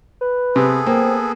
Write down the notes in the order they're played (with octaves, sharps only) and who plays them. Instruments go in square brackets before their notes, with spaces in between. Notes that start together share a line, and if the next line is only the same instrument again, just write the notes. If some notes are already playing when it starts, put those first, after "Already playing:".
[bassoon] B4
[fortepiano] C3 [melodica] B3 G#4 A4
[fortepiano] A#3 [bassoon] C4